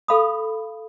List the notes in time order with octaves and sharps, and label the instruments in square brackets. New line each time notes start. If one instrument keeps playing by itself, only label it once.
[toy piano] A4 F5 B5 D#6